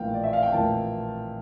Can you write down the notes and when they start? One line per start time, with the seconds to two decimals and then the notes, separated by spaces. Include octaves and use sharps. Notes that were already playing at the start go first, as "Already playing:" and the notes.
Already playing: A#1 A2 E3 A#3 F5 G5
0.14 D5
0.23 E5
0.33 F5
0.43 G5
0.52 A#1 A2 E3 A#3 A5